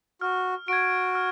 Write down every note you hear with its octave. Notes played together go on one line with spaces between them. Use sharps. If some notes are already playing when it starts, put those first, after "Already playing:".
F#4 F6
F#4 G#6 D7
F6